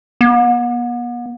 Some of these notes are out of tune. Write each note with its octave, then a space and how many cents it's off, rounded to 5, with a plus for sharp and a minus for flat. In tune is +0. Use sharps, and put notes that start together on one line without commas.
B3 -40